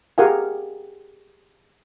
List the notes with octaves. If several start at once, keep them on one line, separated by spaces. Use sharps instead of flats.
G4 G#4 A#4 F5 F#5 G#5